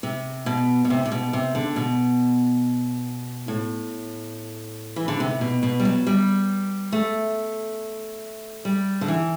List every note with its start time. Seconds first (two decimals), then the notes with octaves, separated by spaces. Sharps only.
0.03 C3
0.46 B2
0.85 B2
0.90 C3
1.06 C3
1.12 B2
1.33 C3
1.55 D3
1.76 B2
3.48 A2
4.96 E3
5.08 D3
5.20 C3
5.41 B2
5.63 B2
5.80 G3
5.85 F#3
6.07 G3
6.92 A3
8.65 G3
9.01 D3
9.08 E3